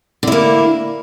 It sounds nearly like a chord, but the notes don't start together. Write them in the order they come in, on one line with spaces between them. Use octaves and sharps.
D3 E4 A#3